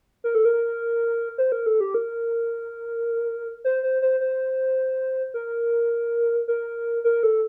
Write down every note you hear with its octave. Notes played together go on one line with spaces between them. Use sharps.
A#4
A4
A#4
C5
A#4
A4
G4
A#4
C5
C5
C5
C5
A#4
A#4
A#4
A4